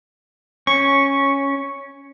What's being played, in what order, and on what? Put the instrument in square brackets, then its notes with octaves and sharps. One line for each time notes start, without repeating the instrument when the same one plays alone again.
[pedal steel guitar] C#4 [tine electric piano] C#6